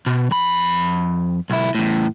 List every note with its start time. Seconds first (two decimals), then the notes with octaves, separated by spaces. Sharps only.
0.06 B2
0.31 F2 B5
1.50 B1 E4
1.75 E2 A2